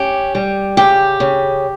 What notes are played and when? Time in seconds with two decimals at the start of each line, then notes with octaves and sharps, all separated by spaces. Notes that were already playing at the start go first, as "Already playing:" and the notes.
Already playing: C#4 G4
0.35 G3
0.77 C#3 G4
1.20 C#3